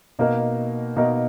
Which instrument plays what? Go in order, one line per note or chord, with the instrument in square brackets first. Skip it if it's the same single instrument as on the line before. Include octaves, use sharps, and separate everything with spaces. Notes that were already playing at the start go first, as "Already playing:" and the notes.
[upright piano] B2 A#3 D#4 A#4
B2 A#3 D#4 A#4